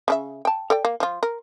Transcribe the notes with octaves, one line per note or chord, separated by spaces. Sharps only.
C#3 D4 E5
G5 A5
A4 D5 G5
A#3
F3 F4
A#4